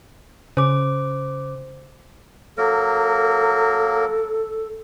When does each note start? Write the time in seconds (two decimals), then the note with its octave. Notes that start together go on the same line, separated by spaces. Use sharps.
0.57 C#3 C5 D6
2.58 F#3 A#3 A4 A#4